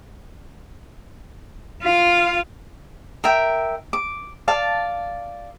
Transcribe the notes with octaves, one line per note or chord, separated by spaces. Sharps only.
F4 F5
A#4 E5 G5
D6
D5 F5 A5